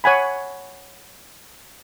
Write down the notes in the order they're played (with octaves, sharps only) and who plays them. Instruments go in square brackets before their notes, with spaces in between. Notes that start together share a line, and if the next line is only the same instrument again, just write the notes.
[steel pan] C#5 F#5 G#5 B5